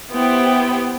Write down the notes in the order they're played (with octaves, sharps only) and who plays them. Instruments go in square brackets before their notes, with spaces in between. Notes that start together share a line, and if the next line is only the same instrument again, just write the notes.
[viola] B3 [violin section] E4 G4 C5 G5